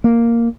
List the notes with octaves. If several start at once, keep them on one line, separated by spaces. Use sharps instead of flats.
A#3